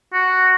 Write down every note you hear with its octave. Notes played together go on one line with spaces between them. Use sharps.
F#4